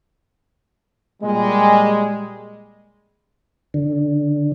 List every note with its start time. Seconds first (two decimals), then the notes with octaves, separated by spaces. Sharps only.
1.22 A#2 G3 G#3
3.74 D3